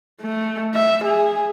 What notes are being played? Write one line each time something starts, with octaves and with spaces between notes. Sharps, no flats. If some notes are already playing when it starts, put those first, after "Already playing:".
A3
E5
G#4